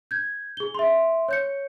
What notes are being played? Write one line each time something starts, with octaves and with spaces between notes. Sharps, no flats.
G6 G#6
G#4 G7
E5 C6
C#5 G6 C#7